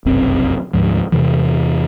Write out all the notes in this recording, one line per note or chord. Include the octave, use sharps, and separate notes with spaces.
F1 B1 F#2 C4
D2 G#2 F3
E2 C3 E3